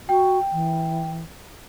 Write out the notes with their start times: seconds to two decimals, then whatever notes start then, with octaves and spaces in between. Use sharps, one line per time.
0.09 F#4 G5
0.52 E3